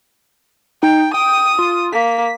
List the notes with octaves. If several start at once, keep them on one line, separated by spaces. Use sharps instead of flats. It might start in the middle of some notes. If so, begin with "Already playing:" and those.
D#4 G5
G5 D#6
F4
A#3 B6